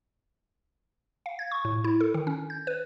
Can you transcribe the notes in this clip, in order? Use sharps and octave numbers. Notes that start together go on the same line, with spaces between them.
F5
G#6
C#6
A2
E4
A4
D#3
C#4
G6
B4